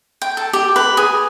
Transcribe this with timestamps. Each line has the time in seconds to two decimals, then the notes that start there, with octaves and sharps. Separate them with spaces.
0.22 G5
0.37 A4
0.53 G4
0.76 B4
0.97 G#4